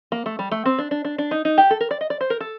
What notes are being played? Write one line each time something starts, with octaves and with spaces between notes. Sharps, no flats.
A#3
A3
G3
A3
C4
D4
D4
D4
D4
D#4
D#4
G4
A4
A#4
D5
D#5
D5
C5
A#4
A4